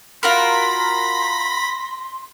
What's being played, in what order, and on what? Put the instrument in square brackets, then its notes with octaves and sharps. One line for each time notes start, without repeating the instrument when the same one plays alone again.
[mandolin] F4 F#4 A#4 [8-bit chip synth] B5 A#6 B6 [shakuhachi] C6